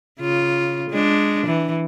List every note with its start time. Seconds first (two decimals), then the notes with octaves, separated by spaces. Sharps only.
0.20 C#3 F4
0.90 G#3 D4
1.47 E3